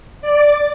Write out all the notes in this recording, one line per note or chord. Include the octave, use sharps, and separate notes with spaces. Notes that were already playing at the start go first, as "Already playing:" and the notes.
D5